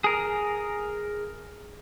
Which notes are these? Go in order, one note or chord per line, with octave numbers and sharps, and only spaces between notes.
G#4 A#4